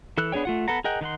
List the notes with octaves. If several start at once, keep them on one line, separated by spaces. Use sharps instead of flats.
E3 A4 E6 F#6
B3 D4 G#4 C#5 G5
A3 F4 F#5
B3 A4 B4 F#5 A#5
G#4 A#4 D#5 F#5 G5
D#3 D#4 F#5 C6